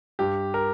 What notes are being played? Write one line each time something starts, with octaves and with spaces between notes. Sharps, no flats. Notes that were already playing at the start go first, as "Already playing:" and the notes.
G2 G4
A#4